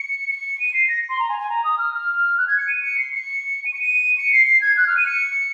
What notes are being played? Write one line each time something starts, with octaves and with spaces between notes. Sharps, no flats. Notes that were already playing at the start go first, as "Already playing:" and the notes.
Already playing: C#7
C#7
D#7
C7
A#6
C6
A#5
G#5
G#5
A#5
D#6
F6
F6
F#6
G#6
C#7
D#7
C#7
C7
C#7
D#7
C#7
D#7
C#7
C7
C7
G#6
F#6
F6
D#7
C#7